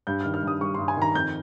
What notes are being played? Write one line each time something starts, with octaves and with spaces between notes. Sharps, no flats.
G2 G6
F6
D#3
F6
G2 D#6
G3 C#6
G2 C6
G#5
D#3 A#5
F2 G6